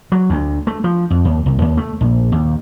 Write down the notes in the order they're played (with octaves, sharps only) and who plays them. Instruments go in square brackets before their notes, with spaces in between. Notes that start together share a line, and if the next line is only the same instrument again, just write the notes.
[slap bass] F#3
D2
A3
F3
F2
D#2
C2
D#2
A3
A#1
D#2